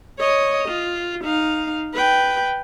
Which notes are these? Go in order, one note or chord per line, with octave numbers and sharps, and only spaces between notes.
C#5 D#5
F4
D#4 F5
B4 G5